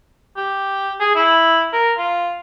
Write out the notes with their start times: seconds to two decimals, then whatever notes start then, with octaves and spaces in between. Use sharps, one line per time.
0.37 G4
1.00 G#4
1.15 E4
1.73 A#4
1.98 F4